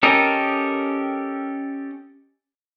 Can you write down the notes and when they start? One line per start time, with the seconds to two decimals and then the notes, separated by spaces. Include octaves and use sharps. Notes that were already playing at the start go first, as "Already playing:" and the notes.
0.03 C#4 G4 A4 A#4 D#5